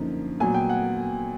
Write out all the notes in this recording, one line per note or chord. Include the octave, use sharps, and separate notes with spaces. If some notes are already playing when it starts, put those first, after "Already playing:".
Already playing: F#2 D3 F3 A#3 D#4
A#2 F#3 B3 G#5
G5
F#5